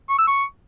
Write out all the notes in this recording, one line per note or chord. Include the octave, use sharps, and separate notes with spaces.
C#6
E6
C#6